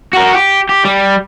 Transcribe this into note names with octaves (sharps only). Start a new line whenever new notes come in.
F#4 A#4
G4
G4
G3